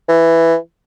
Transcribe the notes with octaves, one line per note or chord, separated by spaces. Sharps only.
E3